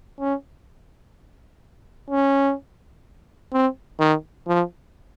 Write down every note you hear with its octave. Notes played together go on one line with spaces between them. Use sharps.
C#4
C#4
C4
D#3
F3